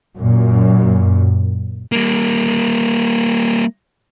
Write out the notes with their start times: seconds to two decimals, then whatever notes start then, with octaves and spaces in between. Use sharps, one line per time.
0.19 F#2 A#2
1.92 G3 A#3